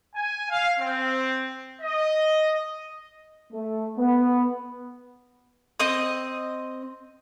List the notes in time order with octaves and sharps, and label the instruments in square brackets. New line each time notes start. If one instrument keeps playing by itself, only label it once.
[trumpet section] G#5
F5
C4
D#5
[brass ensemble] A3
B3
[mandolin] C4 D#5 D#6